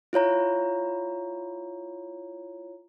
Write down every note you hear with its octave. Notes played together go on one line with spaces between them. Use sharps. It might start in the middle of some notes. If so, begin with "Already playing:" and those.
E4 F4 C#5 A#5